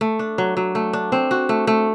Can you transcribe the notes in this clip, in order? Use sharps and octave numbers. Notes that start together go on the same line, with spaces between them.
A3
D4
F#3
F#3
A3
D4
C4
F#4
A3
A3